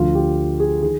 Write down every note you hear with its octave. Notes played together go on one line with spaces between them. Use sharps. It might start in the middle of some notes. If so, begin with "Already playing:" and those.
Already playing: D2 D3 F3 F4
G4
G#4
D#3 G#4